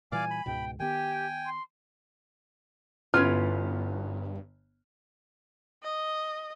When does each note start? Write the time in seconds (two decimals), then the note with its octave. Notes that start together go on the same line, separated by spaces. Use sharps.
0.12 A#2 E3 G3 D5 F5 G#5 D6
0.30 B5
0.46 C#2 G#2 B2 G5
0.80 D#3 B3 G4 G5 G#5
1.46 C6
3.14 G1 G2 B3 C#4 E4 F4 F6
5.83 D#5